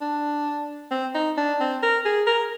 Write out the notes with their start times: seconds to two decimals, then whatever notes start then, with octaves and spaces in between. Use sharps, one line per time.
0.01 D4
0.91 C4
1.15 D#4
1.38 D4
1.60 C4
1.83 A#4
2.05 G#4
2.27 A#4